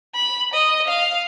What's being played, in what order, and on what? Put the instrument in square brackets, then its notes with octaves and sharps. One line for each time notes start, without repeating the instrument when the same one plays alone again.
[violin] B5
D#5
F5